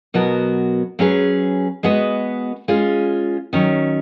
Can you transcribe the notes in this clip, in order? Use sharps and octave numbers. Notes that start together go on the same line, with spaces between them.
B2 F#3 B3 F#4 A#4
F#3 C#4 G#4 B4
G#3 B3 F#4 B4 D#5
G#3 C#4 F4
D#3 F#3 C#4